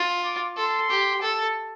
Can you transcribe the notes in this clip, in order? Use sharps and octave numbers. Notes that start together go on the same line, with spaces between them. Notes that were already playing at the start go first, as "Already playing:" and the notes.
Already playing: F4
D6
A4 C6
G4
A4